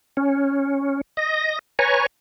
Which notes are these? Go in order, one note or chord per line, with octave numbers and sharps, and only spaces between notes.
C#4
D#5 A#6
B4 C#5 G#5 A#5 C#6